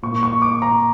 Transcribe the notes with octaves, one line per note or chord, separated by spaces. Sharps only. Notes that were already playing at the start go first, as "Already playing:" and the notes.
A#2 C#6
C#6
D6
A#5